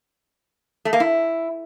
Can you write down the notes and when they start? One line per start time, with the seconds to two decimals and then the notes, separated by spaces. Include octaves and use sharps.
0.85 A3
0.93 A#3
1.00 E4